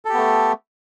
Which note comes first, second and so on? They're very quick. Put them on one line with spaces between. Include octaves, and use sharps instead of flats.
A4 G4 B3 A3